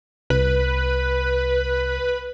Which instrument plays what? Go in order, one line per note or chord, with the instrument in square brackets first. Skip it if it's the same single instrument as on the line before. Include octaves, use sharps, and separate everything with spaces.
[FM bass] C2 [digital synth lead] B4